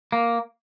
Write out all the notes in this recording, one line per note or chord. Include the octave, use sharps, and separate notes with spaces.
A#3